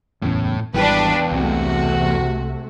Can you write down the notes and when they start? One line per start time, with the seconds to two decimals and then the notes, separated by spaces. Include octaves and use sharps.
0.22 F#1 E2 A2 C#4
0.74 G#1 E2 E3 G3 D4 B4 G5
1.31 C2 C3 A3 C4 F#4